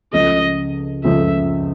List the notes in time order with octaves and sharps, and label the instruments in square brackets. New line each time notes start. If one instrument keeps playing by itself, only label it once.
[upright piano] C#2 C#3 F3 A3 [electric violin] D#5
[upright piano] C#2 C#3 F3 A3 [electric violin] E5